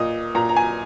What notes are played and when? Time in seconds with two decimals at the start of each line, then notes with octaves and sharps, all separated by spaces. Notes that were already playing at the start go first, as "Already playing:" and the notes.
Already playing: A#2 D#5
0.35 A#2 A#5
0.49 A#5
0.56 G#5